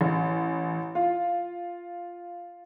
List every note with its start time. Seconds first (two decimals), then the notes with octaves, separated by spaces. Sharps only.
0.01 A1
0.95 F4